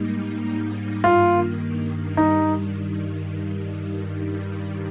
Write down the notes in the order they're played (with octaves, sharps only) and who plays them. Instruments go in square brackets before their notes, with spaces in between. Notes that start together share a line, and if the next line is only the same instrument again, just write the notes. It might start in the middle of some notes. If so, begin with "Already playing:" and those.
Already playing: [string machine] G#2 G3 A#3 D#4
[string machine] G2 D#3 A#3 [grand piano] F4
[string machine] G2 D#3 G3 [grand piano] D#4